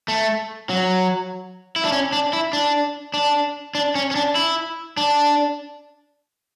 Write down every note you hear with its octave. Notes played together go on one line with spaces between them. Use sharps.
A3
F#3
E4
D4
C#4
D4
E4
D4
D4
D4
C#4
C#4
D4
E4
D4